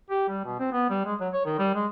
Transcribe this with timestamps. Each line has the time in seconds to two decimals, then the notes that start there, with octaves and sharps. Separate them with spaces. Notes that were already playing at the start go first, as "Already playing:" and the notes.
0.10 G4
0.28 G3
0.45 B2
0.59 C4
0.72 B3
0.90 G3
1.05 G#3
1.20 F#3
1.33 C#5
1.45 D#3
1.59 G3
1.75 G#3